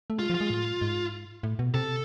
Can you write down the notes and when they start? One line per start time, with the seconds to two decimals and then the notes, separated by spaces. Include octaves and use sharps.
0.10 A3
0.19 G#3 F4
0.30 F3
0.35 F4
0.41 G#3
0.50 A2
0.81 G#2
1.43 A2
1.59 B2
1.74 C3 A4